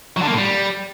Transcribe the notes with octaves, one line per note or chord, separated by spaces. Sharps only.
F#3
D3
A#3
A2
G3